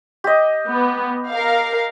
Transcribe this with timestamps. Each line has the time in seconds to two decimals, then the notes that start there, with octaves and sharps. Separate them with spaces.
0.24 G4 D#5
0.69 B3
1.29 A#4 F5